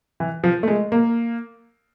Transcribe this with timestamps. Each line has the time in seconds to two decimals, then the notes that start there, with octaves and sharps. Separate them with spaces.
0.20 E3
0.44 F3
0.63 A3
0.68 G#3
0.92 A#3